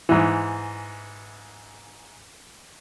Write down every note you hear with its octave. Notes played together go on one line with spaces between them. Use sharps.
G#2 E3